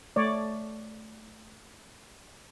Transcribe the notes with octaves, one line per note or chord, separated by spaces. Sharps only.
A3 C#5 D5